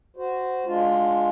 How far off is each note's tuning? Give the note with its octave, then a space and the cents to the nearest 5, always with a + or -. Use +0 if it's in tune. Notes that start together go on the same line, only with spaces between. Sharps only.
F#4 +0 C5 -15
G#3 +10 D4 +0 F4 +15